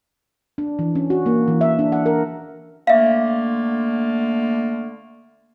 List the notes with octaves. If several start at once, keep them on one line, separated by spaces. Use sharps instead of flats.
D4
E3
C#4
F#4
A#3
E3
E5
D4
F#5
A#4
D3 A3 A#3 E5 F5